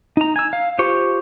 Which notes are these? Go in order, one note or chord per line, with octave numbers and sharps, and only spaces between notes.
D#4 A#5
G#5 E6
F5
F4 G4 C5 C#6